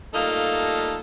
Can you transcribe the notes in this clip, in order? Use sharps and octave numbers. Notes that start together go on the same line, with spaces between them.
G3 A3 A#3 D#4 F4 A4